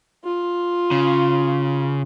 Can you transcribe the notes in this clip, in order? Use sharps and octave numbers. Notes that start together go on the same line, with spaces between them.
F4
C#3